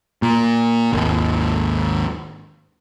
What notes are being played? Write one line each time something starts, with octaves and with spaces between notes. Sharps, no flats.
A#2
G#1 D#2